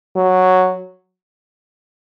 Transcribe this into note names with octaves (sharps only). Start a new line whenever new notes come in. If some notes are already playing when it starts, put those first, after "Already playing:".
F#3